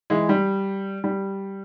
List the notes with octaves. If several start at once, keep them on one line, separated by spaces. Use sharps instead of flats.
E3 G#3
G3
G3